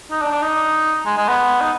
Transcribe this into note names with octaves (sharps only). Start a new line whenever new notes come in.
D#4
D4
D4
D#4
G#3
G#3
B3
D#4